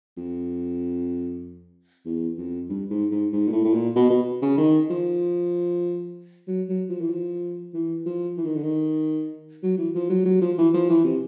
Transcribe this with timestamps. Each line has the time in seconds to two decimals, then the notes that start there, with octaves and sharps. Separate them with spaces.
0.17 F2
2.06 E2
2.38 F2
2.70 G2
2.90 G#2
3.11 G#2
3.33 G#2
3.48 A#2
3.53 A2
3.64 A2
3.74 A#2
3.96 B2
4.10 B2
4.42 C#3
4.58 D#3
4.90 F3
6.47 F#3
6.69 F#3
6.89 F3
7.01 E3
7.10 F3
7.74 E3
8.06 F3
8.37 E3
8.45 D#3
8.55 D3
8.63 D#3
9.63 F#3
9.78 E3
9.95 F3
10.10 F#3
10.26 F#3
10.41 F3
10.58 E3
10.74 F3
10.89 E3
11.04 C3